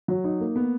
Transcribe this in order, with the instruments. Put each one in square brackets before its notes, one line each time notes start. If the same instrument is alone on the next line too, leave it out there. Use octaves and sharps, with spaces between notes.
[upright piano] F#3
D#4
A#3
B3